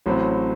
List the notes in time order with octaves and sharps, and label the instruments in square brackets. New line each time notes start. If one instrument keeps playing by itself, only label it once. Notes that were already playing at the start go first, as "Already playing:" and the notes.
[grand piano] A1 A2 F#3 C4